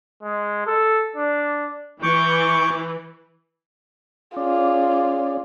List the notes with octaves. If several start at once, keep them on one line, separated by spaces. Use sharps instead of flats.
G#3
A4
D4
E3 C#6 D6 G6
C#4 F4 G#4 D5